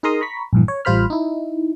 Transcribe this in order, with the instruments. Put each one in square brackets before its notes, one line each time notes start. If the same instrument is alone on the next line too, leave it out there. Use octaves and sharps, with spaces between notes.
[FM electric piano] D#4 G#4 A#4 A#5 C6 D#6
A#5 B5 C#6 B6
A#1 G2 E3
C#5
A1 G3 F4 C5 B5 F6
D#4 E4